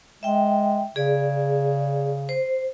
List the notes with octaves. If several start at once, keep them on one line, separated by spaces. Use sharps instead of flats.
G#3 E5 G5
C#3 G#4 D5
C5